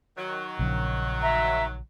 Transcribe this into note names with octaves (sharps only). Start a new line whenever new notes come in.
D#3 F#3
A#1 C#3 F3
E5 A#5